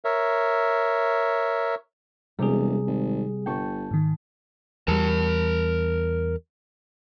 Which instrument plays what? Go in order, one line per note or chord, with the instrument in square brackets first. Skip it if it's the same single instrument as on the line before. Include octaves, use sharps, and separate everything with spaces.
[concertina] A#4 C#5 E5
[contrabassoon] E1 [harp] C3 [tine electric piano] G3 G#4
[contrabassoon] G#1
[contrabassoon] G1 [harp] G5 A5 C#6
[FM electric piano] G#2 D#3
[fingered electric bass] E2 G3 [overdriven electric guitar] A#4 A5